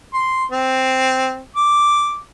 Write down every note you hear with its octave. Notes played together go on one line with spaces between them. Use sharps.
C6
C4
D6